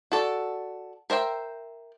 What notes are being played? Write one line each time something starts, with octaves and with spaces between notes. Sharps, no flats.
F#4 A4 D5
A#4 C5 E5 G5